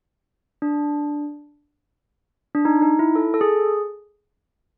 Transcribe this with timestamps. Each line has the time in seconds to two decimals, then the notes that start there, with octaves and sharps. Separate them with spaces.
0.62 D4
2.55 D4
2.65 D#4
2.82 D#4
2.99 E4
3.15 A4
3.34 A4
3.41 G#4